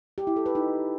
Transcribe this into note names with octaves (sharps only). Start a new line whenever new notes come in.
G4
E4
A4
B4
D#4